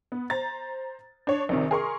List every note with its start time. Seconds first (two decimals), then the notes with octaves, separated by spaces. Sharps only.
0.12 B3
0.30 C5 A#5 A6
1.27 D4 C#5
1.49 A#1 C3 D#3
1.71 G#4 A#4 C6 C#6